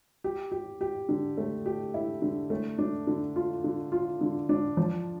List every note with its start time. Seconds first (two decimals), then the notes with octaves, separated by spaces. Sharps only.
0.24 G4
0.52 G4
0.81 G4
1.09 D3
1.37 A3
1.66 G4
1.94 E4
2.22 D3
2.50 A3
2.78 D4
3.07 D3
3.36 F4
3.64 D3
3.92 F4
4.21 D3
4.49 D4
4.77 F3